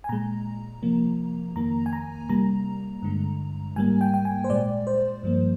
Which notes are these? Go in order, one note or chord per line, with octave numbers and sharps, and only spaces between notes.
G#5
A#2 G#3 A#5
C3 F3 A#3
F2 D#3 A#3 A#5
G#5
A#5
C3 G3 A#3 A#5
G2 D3 G#3
G#2 G3 A#3 G#5
G5
G5
G#5
C5
A#2 G#3 D5
C5
G2 F3 A#3